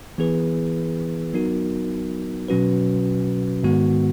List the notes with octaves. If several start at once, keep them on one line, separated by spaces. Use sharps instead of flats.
E3 B3 E4 G#4 B4
F#3 B3 D#4 F#4 A#4
B2 F#3 C#4 F#4 B4
G#2 D#3 G#3 B3 F#4